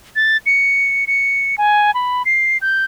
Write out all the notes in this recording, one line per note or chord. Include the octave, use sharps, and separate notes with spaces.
A6
C#7
C#7
G#5
B5
C7
G6